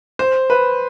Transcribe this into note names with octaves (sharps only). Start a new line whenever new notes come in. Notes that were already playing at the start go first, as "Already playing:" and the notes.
C5
B4